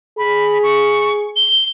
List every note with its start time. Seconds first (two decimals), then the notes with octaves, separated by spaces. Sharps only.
0.18 G#4 B5
0.63 C#6
1.36 G7